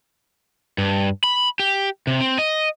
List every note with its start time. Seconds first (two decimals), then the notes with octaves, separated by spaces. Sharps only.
0.78 G2
1.24 B5
1.60 G4
2.07 C3
2.20 C4
2.39 D#5